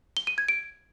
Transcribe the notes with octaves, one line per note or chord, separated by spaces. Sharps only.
G7
D#7
G#6
D7